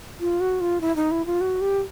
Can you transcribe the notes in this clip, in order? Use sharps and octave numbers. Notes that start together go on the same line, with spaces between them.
F4
F#4
F4
E4
D#4
E4
F4
F#4
G4